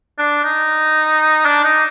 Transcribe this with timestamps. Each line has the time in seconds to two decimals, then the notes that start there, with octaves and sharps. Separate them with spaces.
0.19 D4
0.44 D#4
1.45 D4
1.64 D#4